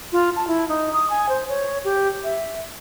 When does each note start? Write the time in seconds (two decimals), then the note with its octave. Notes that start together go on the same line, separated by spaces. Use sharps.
0.13 F4
0.36 A5
0.48 E4
0.69 D#4
0.93 D#6
1.10 G#5
1.29 C5
1.49 C#5
1.84 G4
2.24 E5